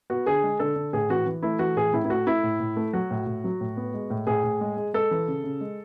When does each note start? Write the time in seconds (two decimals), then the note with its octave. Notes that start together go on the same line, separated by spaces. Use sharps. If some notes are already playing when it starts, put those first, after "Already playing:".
0.10 B3 F#4
0.26 D3 G#4
0.43 G#3
0.59 D3 A4
0.76 D3
0.93 A2 G#4
1.10 E3 F#4
1.26 E3
1.43 A3 E4
1.59 E3 F#4
1.76 A2 G#4
1.93 A2 E4
2.05 E4
2.09 A3 F#4
2.27 A3 E4
2.43 A2
2.60 A2
2.76 A3
2.93 F#3 F#4
3.10 A2
3.26 A2
3.44 F#3
3.61 A2
3.77 B3
3.94 G#3
4.10 A2
4.27 A2 G#4
4.44 A2
4.61 G#3
4.77 G#3
4.94 G#3 A4
5.11 E3
5.28 C#3
5.44 C#3
5.61 G#3